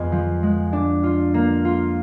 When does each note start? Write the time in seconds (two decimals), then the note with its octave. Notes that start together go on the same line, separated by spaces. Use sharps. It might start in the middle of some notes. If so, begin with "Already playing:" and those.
Already playing: F2 G#3 B3
0.12 F3
0.43 G#3
0.73 D4
1.03 F4
1.34 A#3
1.65 F4